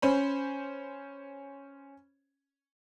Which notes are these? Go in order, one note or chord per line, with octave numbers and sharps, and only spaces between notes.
C#4 C5 B5